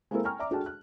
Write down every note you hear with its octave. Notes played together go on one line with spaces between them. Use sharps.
G#3 A#3 C4 E4 A4 A#4
G5 G#5 A#5 C#6 F6
D5 E5 A#5 D6
D4 F#4 G#4 A4 G5 A5
F#6